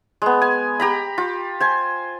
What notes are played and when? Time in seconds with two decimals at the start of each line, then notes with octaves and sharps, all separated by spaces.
0.22 G#3 B3
0.42 G#5
0.80 G4 A#5 B5
1.18 F4
1.60 C5 G#5